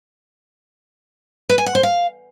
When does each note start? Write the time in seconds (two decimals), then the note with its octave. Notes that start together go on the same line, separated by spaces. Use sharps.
1.49 B4
1.58 G#5
1.66 F#5
1.75 C5
1.83 F5